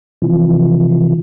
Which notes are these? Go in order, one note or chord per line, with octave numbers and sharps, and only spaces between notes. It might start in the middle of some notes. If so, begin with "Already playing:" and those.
C3 E3 F3